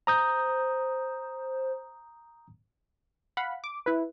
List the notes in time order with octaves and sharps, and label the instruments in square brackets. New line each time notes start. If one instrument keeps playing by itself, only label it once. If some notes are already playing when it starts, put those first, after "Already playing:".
[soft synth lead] C5 [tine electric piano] A#5 D#6 G6
[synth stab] F5 F#5 B5
D6
E4 B4